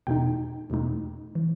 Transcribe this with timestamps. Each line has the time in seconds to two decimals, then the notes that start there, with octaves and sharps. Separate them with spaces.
0.07 E2 B2 A3 D#4 G5
0.70 E2 B2 A3 D#4
1.35 E3